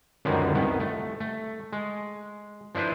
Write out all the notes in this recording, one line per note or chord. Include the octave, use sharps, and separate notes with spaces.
C#2 F#2 D3 D#3 F3 G3
C2 D#3 B3
A3
A3
G#3
F3 D4 E4 B4 C5